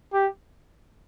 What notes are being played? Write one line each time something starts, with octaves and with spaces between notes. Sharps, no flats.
G4